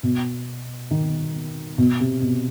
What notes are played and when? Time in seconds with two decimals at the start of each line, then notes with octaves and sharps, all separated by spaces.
0.03 B2
0.91 D#3
1.78 B2
2.00 C3
2.22 B2